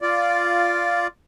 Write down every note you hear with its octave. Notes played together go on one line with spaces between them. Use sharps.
F4 D5